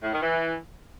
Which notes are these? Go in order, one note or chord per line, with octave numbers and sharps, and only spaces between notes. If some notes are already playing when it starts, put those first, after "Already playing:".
A2
D#3
E3